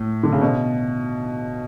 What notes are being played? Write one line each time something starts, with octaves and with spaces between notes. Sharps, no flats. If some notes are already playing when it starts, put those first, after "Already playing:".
Already playing: A2
D3
C#3
B2